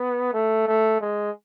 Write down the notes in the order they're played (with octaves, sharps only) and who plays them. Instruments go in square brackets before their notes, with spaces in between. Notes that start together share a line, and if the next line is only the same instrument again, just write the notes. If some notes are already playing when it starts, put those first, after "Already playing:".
Already playing: [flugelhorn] B3
A3
A3
G#3